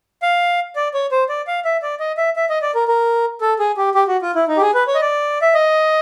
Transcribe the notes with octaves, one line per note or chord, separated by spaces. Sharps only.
F5
D5
C#5
C5
D5
F5
E5
D5
D#5
E5
E5
D#5
D5
A#4
A#4
A4
G#4
G4
G4
F#4
F4
E4
D#4
G4
G#4
B4
C#5
D#5
D5
E5
D#5